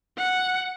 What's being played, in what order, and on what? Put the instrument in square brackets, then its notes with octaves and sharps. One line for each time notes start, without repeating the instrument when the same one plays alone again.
[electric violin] F#5